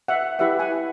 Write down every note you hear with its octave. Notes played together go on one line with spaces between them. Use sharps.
E5 F#5
E4 G4 B4 E5 F#5
F#5 G#5